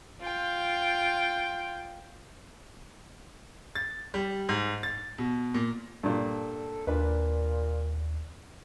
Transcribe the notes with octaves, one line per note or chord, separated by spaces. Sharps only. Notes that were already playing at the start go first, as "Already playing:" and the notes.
F4 G5
A6
G3
G#2
A6
B2
A#2
G2 A#2 A4
D#2 A#2 D4 B4